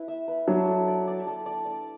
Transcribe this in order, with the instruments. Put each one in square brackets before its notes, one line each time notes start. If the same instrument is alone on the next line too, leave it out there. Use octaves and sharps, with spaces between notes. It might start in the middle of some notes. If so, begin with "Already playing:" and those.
Already playing: [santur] E4 B4
E5
B4
[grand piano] F#3 [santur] D4
[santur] A4
D5
D5
A4
D5
D5